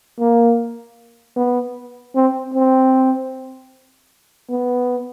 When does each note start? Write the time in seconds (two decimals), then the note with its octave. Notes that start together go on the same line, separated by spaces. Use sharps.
0.19 A#3
1.36 B3
2.15 C4
2.54 C4
4.50 B3